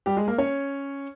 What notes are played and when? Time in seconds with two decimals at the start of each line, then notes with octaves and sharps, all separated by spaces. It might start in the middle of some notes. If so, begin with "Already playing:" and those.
0.06 G3 G4
0.17 G#3 G#4
0.28 A#3 A#4
0.38 C#4 C#5